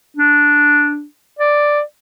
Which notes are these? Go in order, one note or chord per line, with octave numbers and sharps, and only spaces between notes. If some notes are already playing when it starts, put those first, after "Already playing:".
D4
D5